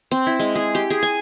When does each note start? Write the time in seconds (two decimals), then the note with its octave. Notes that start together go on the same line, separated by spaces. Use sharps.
0.11 C4
0.27 E4
0.39 G#3
0.55 G#4
0.75 G4
0.90 G#4
1.03 G#5